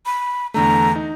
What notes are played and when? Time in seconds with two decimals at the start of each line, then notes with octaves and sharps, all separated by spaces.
0.06 B5
0.54 E2 D3 A3 A#5
0.96 D#4